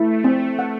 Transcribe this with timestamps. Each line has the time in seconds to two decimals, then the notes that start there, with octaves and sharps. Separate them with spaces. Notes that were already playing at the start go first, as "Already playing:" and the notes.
Already playing: A3 E4
0.24 C4
0.59 F#5